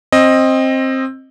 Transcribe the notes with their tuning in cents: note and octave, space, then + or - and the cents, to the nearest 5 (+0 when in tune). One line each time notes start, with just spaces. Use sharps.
C4 +15 D#5 +0